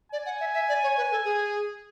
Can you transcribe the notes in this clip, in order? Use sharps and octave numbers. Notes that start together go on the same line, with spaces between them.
D5 G#5
F#5
E5
E5
D5
C#5
B4
A4
G#4